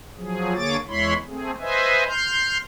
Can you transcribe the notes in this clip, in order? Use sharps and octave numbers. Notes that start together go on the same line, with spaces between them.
F3 F#3 G#4
D3 A#3 G#4 C#5 D6 A6
E2 G#3 E4 C#5 B5 C6
A3 C4 G#4
B4 C5 D#5 E5 G#5
C6 F6 G6